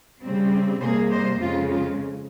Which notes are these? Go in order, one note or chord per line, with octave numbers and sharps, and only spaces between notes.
C#3 G3 C4
C3 G3 A#3 G#4 C5
C5 D#5
F2 C#3 G#3 F4
F4